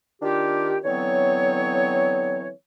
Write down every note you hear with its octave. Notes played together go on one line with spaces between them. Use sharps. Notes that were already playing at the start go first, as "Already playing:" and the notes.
D#3 D4 F4 G4
D3 E3 F#3 B3 C4 C#5